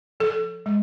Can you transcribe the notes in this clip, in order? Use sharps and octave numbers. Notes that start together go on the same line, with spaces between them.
F3 A4
G#3